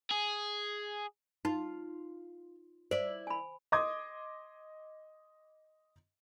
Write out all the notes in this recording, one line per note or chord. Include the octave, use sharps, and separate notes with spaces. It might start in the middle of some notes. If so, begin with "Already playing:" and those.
G#4
D#4 F4
E4 C5 D5
G#5 B5
D#5 C6 D6 D#6 G#6